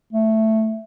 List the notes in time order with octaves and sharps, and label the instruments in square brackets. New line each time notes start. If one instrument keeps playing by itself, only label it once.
[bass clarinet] A3